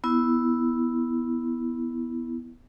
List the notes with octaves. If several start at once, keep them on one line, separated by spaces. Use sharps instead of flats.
B3 E4